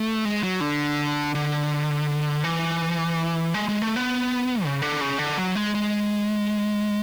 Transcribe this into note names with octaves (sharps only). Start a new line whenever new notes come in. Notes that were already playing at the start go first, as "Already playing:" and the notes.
Already playing: A3
G#3
F#3
D3
D3
E3
G#3
G#3
A3
B3
C#3
D3
C#3
D3
F#3
G#3
G#3